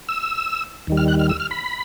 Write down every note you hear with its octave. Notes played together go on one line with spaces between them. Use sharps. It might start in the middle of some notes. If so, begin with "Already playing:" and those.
E6
D#2 D#3 G3
F6
F#6
F6
E6
F6
B5